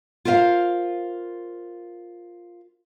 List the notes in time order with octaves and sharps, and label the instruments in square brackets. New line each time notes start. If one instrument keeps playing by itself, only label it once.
[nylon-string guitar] F4 A#4 C5 E5 F5